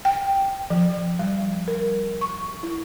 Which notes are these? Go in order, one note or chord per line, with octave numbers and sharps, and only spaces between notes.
G5
F3
G3
A#4
C#6
E4